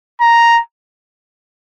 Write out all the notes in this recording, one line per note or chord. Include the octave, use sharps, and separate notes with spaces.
A#5